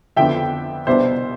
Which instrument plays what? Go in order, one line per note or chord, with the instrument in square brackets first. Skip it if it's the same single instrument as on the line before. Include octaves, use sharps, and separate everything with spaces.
[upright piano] F2 D3 F3 B3 E5 G5
C2 B2 B3 D4 C5 E5